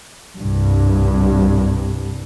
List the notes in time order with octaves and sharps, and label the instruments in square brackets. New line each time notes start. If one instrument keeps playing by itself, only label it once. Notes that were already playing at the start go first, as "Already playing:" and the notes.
[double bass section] C2 G2